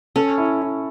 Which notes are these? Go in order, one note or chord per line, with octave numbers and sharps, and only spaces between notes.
C#4 A4
E4
E4